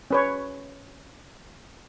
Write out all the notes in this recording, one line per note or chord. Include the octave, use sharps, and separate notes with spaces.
C#4 B4 C#5